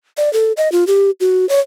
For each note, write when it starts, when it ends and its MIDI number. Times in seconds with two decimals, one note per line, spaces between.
0.17 0.32 74
0.33 0.52 69
0.57 0.71 75
0.72 0.87 65
0.87 1.11 67
1.20 1.48 66
1.49 1.60 73